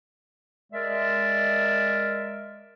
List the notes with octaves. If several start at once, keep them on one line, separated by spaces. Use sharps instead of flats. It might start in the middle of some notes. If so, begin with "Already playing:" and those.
G#3 A#4 D5 E5